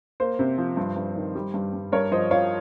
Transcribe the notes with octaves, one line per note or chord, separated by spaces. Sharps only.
A#3 C5
C3
F3
G2
G2
D#3
G3
G2
G2
G2 A#4 C#5
F3 C5 D#5
F3 C#5 F5